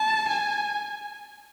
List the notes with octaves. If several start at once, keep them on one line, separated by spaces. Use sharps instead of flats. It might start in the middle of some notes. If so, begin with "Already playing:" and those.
Already playing: A5
G#5